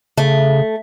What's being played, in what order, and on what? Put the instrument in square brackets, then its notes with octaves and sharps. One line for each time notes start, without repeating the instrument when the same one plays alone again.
[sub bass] C#3 [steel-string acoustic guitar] A3